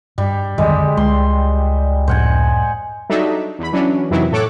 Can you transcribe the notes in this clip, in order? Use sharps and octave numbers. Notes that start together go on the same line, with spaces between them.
G2 G3
B1 F2 D3 D#3 G3 G#3
C#2 G#3 C6
F2 A2 C5 F#5 G#5
F#3 G3 D4 D#4 A4 E5
E2 B5
E3 F#3 C#4 D4
F2 C3 D#3 E3 F#3 E4
A2 A4 C#5 D6 F#6